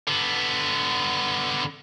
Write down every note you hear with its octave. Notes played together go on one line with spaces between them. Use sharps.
D3 B3